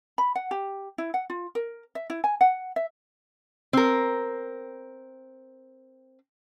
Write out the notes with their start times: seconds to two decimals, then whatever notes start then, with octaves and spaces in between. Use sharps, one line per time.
0.18 B5
0.35 F#5
0.51 G4
0.98 E4
1.14 F#5
1.30 F4
1.55 A#4
1.95 E5
2.10 E4
2.24 G#5
2.41 F#5
2.76 E5
3.73 C4 A#4